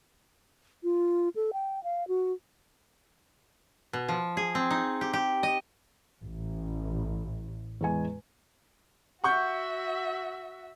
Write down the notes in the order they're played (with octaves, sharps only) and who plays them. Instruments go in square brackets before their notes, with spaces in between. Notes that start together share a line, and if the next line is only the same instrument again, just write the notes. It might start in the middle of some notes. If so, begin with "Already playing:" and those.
[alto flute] F4
A4
G5
F5
F#4
[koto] B2
F3
G#4
C4
D#4
G4
G4
D#5
[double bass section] A1
[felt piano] E2 G#3 G#5
[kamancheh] F#4 E5 [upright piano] F#5 C#6 G6